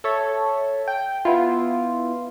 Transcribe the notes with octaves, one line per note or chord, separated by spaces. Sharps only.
A4 C#5 E5
G5
B3 E4 F4